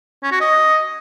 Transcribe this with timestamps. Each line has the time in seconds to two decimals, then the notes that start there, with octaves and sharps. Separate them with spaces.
0.23 C#4
0.32 F#4
0.41 D#5